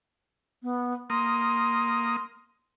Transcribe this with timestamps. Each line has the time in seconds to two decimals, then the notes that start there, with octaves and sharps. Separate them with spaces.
0.62 B3
1.10 A#3 C6 D#6